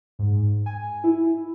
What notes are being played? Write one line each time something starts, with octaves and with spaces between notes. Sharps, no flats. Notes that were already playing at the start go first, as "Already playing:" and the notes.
G#2
G#5
E4